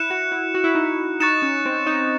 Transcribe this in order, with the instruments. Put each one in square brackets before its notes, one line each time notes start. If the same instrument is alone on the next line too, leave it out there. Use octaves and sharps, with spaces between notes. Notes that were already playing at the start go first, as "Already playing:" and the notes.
Already playing: [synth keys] E4 [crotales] F#6 C#7 E7
[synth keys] F#4
E4
F#4
E4
D#4
E4
[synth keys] D#4 [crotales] C#6 F#6 A6 C#7 E7
[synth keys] C#4
C4
D#4